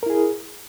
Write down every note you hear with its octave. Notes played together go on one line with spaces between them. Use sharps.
E4 G#4 A#4